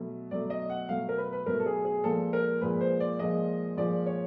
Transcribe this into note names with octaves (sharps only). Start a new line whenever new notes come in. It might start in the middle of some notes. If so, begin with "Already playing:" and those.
Already playing: B2 F#3 A3
B2 F#3 A3 D5
D#5
F#5
B2 F#3 A3 F5
A#4
B4
B4
B2 F#3 A3 A#4
A4
G#4
G#4
A#2 F3 G#3 A4
A#4
A#2 F3 G#3 B4
C5
D5
A#2 F3 G#3 D#5
A#2 F3 G#3 D5
C#5